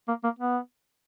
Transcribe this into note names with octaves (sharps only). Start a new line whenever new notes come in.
A#3
A#3
B3